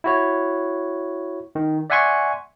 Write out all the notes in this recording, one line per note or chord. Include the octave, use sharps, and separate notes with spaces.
E4 F#4 C#5
D#3
D5 E5 F#5 G#5 C6 C#6